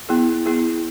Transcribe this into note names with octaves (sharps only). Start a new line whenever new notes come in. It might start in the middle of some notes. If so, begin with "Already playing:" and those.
B3 E4 G#4
B3 E4 G#4